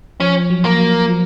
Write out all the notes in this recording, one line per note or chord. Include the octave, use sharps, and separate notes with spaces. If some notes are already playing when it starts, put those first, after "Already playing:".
F3 C#4
F#3
A#3
F#3
F3